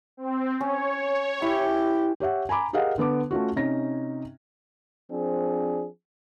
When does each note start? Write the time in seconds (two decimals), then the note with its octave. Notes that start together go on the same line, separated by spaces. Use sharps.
0.17 C4
0.61 C#4 C#5
1.42 E4 G4
2.20 G4 C#5 E5 F#5
2.49 G#5 A#5 B5 D6
2.73 G4 G#4 A#4 D#5 F5 F#5
2.98 D3 B3 A5 D6
3.31 A3 C#4 F4 F#4
3.56 C3 C#4 D#4 A#6
5.10 F3 C4 D4 G#4